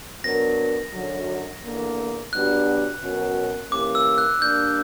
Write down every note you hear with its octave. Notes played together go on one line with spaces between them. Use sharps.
F#3 B3 D4 A#4 A#6
F#2 D3 F#3
E2 D3 A#3
B2 F#3 B3 D4 G4 F#6
B2 F#3 C#4 F#4 A#4
E3 A#3 C#4 G4 D6
E6
F#6
G3 A#3 D4 G6